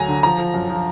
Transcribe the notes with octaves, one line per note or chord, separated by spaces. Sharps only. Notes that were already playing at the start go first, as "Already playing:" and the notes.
Already playing: D2 F#3 G#5 A#5
D3
F3 A#5
F3
F#2
F3